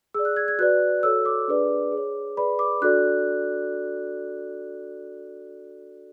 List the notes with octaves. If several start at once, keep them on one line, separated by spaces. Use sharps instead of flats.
G#4 D5 E6
F#6
G#6
G#6
F#4 B4 D5 F#6
F#4 A4 C#5 E6
D6
D4 G#4 B4 D5
G#4
C#5
G#4 B4 D5 B5
D6
D4 F#4 A4 D5 F#6